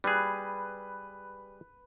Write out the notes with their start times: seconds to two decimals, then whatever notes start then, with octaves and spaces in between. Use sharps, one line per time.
0.04 G3 G#4 B4